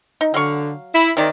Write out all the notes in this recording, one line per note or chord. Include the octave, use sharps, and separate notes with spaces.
D#4
D3 F#3 F5 C#6
E4
C3 D#3 A#4 D5